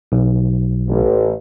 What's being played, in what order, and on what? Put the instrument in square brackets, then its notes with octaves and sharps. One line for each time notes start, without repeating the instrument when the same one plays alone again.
[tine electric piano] B1
[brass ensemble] A1